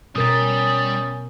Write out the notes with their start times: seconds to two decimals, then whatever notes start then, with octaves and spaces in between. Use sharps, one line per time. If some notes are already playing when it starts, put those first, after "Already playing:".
0.16 B2 G3 C#4 A#4 D#6 A6